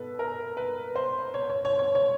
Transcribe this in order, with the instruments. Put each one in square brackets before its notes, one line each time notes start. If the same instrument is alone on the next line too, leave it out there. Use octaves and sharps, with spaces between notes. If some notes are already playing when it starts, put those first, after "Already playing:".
Already playing: [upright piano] B2 B3 A4 B4
A#4
B4
C5
C#5
C#5
C#5
C#5
C#5